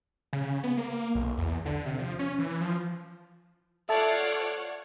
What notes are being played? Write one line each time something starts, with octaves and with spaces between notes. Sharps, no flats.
C#3
B3
A#3
B1
E2
D3
C3
F3
C#4
E3
F3
F4 A4 C#5 D5 E5 F#5 A5